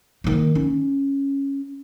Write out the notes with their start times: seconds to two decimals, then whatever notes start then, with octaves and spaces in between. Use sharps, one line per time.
0.24 D#3 A#3
0.55 C#4